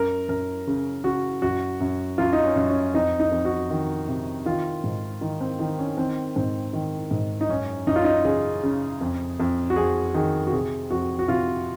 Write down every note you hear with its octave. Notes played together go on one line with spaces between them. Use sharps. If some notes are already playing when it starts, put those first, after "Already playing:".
Already playing: F#2 A#4
F#2 A#4
C#3
C#3 F#4
F#2 F#4
F#2
F#2 F4
D#4
C#4
F#2
C#4
F2 D#4
D#4
F2
F#4
D#3
C3
D#3 F4
G#2
D#3 D#4
C4
D#3 D#4
C#4
D#3 C4
G#2 C4
D#3
G#2
D#4
F#2 C#4
F#2 D#4
F4
D#4
C#3 G#4
C#3
F2
F2
F#4
F2 G#4
D#3 G#4
F#4
C3 G#4
F2 F#4
F#4
C3 F4